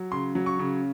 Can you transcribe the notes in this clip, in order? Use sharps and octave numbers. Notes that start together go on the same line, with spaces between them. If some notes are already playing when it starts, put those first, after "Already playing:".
Already playing: F#3
C#3 C6
F#3
C#6
C#3